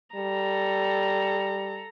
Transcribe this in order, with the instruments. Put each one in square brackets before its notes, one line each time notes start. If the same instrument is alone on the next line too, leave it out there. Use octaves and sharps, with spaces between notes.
[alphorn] G3 [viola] A4 A#5